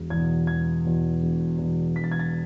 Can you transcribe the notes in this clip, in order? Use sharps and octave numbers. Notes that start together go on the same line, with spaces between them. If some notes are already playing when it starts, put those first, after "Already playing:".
Already playing: E1
E2 B2 G#6
E1 G#6
E2 B2
E1
E2 B2
E1 B6
A6
G#6
A6